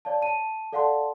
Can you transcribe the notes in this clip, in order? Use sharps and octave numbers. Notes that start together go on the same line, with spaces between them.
C#5 D5 F5 A5
A5 D#7
A4 D5 F5 F#5 A5 C6